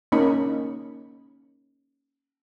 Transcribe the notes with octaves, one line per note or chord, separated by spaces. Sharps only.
A#3 C#4 D#4 B5